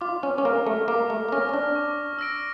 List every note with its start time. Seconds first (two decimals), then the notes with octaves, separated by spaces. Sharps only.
0.01 F4 D6
0.23 C#4
0.38 C#4
0.45 A#3 F6 A#6
0.66 A3
0.88 A#3 D6
1.10 A3
1.29 A#3
1.32 C#4 F6 A#6
1.49 C#4
1.54 D4
1.75 C#6
2.19 E6 A#6 D7